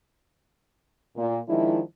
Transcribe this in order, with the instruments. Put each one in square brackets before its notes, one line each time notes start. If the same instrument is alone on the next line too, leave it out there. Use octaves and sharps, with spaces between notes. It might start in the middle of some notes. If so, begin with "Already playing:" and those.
[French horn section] A#2
D#3 F3 G#3 D4 E4